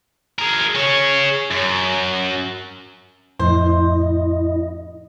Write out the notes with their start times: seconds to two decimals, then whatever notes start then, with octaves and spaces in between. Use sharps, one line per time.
0.39 G#4 A#4
0.75 G#4 C#5
1.51 F#2
3.39 F2 A2 E4 C5 D#5